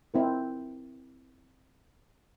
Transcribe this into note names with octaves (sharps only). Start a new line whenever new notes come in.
C4 E4 A#4